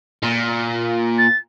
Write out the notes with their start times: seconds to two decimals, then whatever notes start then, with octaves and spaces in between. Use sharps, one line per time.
0.24 A#2
1.18 A6